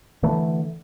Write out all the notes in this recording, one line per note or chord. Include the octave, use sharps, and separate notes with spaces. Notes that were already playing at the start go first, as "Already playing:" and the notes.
D3 E3 A3